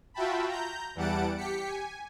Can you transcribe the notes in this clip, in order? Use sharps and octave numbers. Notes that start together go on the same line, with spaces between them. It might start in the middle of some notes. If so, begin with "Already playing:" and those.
F4 F#4 E5 G5 A5 B5
A#5 G6
E2 E3 G3 F#5 A5 D7
G4 B6 C#7
G#5